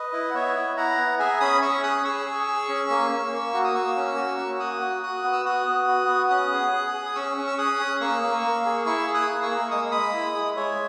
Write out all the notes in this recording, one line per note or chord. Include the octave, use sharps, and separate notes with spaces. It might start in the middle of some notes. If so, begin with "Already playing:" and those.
Already playing: B4 D#5
E4
F#5
B3 C#5 E5
E4
E4 F#5 A#5
B3
G#4 E5 G#5
C#4 B5 D#6
C#4 C#6 E6
G#4 D#6 F#6
G#4 C#6 E6
G#4
G#4
C#4
A#3
A#3
A#3
F#4
D#6
A#3 C#6 E6
C#4
F#4
A#3
F#4 D#6 F#6
F#4
F#4 D#6 F#6
B3
E6
F#4 D#6 F#6
B3
F#4
B3
C#4 D#6 F#6
G#4
G#4
G#4
D#6
C#4 C#6 E6
C#4
E6
G#4 D#6 F#6
C#4
A#3 C#6 E6
A#3
A#3
G#4
E4 C#6 E6
G#4
D#6 F#6
A#3
C#6 E6
A#3
G#3 D#6
E6
G#3 B5 D#6
E4
G#3
G#3 C#5 E5